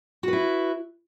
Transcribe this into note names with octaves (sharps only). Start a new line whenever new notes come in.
E4 F#4 B4